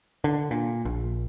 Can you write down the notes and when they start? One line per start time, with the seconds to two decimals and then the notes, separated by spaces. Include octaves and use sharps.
0.24 D3
0.51 A#2
0.85 A#1